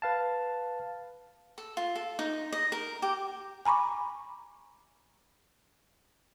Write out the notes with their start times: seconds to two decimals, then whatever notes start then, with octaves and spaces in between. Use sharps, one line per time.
0.02 B4 F5 A5
1.58 A4
1.77 F4
1.95 A4
2.19 D#4
2.53 D#5
2.72 A#4
3.02 G4
3.65 G#5 A#5 B5 C#6 D6